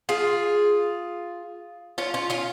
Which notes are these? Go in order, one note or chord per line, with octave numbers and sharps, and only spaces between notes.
F4 G#4
C#4 F4
C#4 F4
C#4 F4